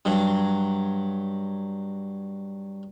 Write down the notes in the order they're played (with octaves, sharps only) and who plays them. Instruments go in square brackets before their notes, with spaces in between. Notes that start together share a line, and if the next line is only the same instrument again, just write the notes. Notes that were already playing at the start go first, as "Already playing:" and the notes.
[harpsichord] G2 F#3